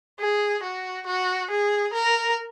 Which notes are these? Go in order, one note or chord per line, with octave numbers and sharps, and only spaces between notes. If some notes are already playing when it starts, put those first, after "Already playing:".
G#4
F#4
F#4
G#4
A#4